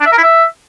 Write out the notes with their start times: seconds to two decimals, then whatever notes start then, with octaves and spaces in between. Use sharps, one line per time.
0.01 D4
0.06 E5
0.12 A#4
0.18 E4
0.23 E5